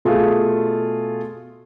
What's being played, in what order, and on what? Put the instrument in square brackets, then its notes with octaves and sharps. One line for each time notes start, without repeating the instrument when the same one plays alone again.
[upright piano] B2 A3 F4 G#4